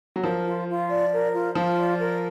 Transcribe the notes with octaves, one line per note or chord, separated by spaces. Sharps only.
F#3
F3 A#4
F4
F4
D5
A#4
F4
F3 F4
D5
A#4